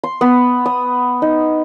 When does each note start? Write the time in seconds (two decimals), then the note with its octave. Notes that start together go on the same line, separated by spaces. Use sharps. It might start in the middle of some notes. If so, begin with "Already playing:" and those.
0.03 C6
0.21 B3
0.66 D#6
1.22 D#4